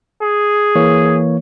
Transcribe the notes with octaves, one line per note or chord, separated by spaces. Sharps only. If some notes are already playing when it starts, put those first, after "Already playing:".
G#4
E3 A#3 C#5